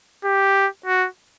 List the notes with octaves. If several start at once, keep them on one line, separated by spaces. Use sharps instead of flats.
G4
F#4